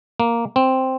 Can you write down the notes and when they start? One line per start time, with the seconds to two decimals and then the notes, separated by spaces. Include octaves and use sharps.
0.20 A#3
0.56 C4